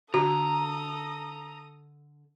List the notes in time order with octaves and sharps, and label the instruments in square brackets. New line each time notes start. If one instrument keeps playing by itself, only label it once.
[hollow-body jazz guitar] D3 [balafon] F#4 [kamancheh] A4 D#6 [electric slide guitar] A#5